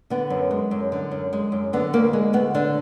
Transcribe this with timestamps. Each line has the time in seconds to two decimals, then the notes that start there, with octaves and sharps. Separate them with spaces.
0.10 D3 B3
0.30 F#2
0.51 G#3
0.71 F#2
0.92 D3
1.11 F#2
1.33 G#3
1.52 F#2
1.73 D3 B3
1.93 D2 A#3
2.13 G#3
2.33 D2 B3
2.54 D3 D4